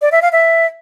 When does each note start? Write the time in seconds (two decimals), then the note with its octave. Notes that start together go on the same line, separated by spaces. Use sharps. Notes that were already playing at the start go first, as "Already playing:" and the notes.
0.02 D5
0.12 E5
0.22 F5
0.32 E5